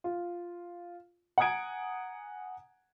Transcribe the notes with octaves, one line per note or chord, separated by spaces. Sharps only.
F4
F#5 G#5 A#5 D#6 G#6 D7